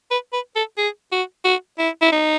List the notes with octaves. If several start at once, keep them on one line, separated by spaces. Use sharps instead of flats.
B4
B4
A4
G#4
F#4
F#4
E4
E4
D#4